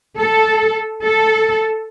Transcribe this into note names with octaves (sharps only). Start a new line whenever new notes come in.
A4
A4